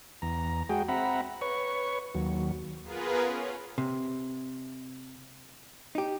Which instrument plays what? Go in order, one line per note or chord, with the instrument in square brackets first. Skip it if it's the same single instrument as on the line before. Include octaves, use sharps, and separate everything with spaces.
[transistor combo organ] E2 A#5
G#3 F#4 G#4 G5
C4 E5 F#5 A#5 B5
B4 C#5 C#6
D#2 F#3
[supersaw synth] B3 F4 G#4 A#4 B4
C#4
[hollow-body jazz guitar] C3
D#4 G4